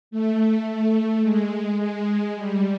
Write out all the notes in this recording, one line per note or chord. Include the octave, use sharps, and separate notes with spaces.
A3
A3
G#3
G#3
G3